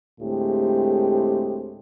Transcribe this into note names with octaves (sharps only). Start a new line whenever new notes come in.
D2 A2 G#3 C4 G4